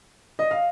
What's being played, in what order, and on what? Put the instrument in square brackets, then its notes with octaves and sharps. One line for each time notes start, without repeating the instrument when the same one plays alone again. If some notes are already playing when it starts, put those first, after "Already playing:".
[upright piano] D#5
F5